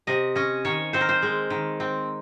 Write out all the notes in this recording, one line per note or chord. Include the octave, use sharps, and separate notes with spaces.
C3 D#5
C#4 D#5
D#3 C#5
C4 C5
A#4
C5
G#3
D#3
C4